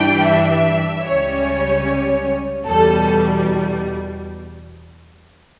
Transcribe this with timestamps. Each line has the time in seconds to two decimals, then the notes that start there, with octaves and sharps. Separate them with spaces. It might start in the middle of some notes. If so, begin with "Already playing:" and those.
Already playing: G2 E3 G3 D4 G5
0.28 E5
1.07 C#2 C#3 G3 C#4 C#5
2.66 E2 B2 G3 A4